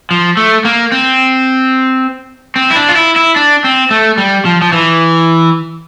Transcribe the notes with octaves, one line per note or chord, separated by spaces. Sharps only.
F3
A3
A#3
C4
C4
E4
D4
F4
E4
E4
D4
C4
A3
G3
F3
F3
E3